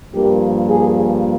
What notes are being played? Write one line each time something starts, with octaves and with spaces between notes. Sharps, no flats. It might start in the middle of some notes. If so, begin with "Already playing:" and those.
G2 F3 A#3 G4
G#4